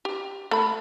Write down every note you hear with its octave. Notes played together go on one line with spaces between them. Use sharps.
G4
A3 B5